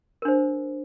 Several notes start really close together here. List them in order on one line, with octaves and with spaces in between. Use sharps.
A#4 D4 C5